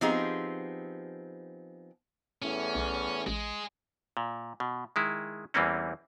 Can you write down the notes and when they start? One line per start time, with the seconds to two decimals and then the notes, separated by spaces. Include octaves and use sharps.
0.01 F3 B3 C4 D#4 G4 G#4
2.42 E2 A2 C#4
2.75 B1
3.27 A1 G#3
4.17 A#2
4.60 B2
4.96 D#3 G#3 E4
5.54 E2 E3 G3 A#3 C4 C#4